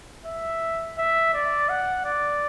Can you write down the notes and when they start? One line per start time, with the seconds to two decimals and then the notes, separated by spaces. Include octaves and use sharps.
0.26 E5
0.98 E5
1.34 D5
1.69 F#5
2.05 D5